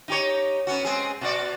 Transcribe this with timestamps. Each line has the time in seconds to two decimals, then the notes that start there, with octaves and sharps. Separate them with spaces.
0.08 D#4 G4 C#5
0.67 B3 C#4 F#4
0.85 G#3 C4 G#4
1.21 B2 F#4 D5